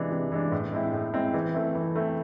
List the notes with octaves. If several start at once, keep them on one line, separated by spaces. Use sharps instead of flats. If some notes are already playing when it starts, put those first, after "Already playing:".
Already playing: C3 E3 G#3 D4
C3
E3 G#3 D4
A2
G#3 C4 E4
A2
G#3 C4 E4
E3
A3 C4 E4
E3
A3 C4 E4